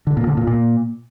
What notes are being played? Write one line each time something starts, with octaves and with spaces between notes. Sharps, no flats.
D3
A#2
D3
A#2
A#2